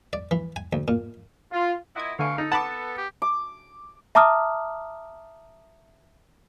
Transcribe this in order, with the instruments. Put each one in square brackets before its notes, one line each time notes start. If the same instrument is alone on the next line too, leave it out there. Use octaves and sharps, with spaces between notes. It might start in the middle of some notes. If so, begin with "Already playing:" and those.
[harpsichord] D5
E3
G#5
D2
A#2
[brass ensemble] F4
[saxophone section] A#2 E4 [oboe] D#5 [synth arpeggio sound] F#5 G#6
[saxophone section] B2 E3 F5 [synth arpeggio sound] D3 A3 G#5 [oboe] C#6
[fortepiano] D#4 [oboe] A4
[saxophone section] B3 [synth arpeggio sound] F#5 B5 D6 [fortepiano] A5
[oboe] G4
[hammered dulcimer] D6
[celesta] E5 A5 A#5 D6 D#6 F6